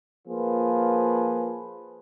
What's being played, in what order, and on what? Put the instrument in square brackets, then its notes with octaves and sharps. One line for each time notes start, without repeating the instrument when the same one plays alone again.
[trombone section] F3 A#3 F4 G#4 B4